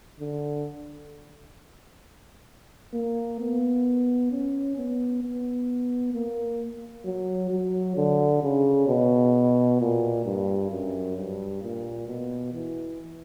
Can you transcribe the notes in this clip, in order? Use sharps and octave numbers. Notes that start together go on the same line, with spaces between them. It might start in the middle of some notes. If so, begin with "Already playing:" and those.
D3
A#3
B3
C#4
B3
B3
A#3
F#3
F#3
D3
C#3
B2
A#2
G2
F#2
G2
A#2
B2
E3